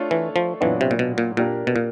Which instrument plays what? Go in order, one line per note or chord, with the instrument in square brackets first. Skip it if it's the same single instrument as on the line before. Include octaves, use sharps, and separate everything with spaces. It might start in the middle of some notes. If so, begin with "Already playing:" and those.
Already playing: [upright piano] A3 D4 F4 A4 C#5
[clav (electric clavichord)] E3
F3
[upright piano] A#2 F#3 B3 D4 [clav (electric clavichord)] E3
[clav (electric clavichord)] C3
A#2
B2
A#2
[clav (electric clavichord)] A#2 [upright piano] A#3 D4 G4 A#4
[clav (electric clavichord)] B2
A#2